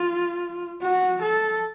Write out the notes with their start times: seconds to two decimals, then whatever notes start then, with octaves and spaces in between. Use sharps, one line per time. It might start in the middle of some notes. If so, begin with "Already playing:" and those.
Already playing: F4
0.82 F#4
1.22 A4